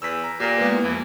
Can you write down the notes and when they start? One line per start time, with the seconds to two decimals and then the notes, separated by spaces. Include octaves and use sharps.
0.02 E2 E6 B6
0.24 A#5
0.40 A#2 A#3 G4 A#4
0.58 G#3 A#3 B3 B4
0.71 A#3 E4
0.84 F2 E3